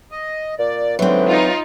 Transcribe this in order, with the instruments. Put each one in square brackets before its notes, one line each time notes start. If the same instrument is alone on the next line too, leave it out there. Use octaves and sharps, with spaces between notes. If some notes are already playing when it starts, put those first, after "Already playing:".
[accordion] D#5
[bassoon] A#2 [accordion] D5
[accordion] G#2 D3 [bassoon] E3 [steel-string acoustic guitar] F#3 C4
[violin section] D#4 F4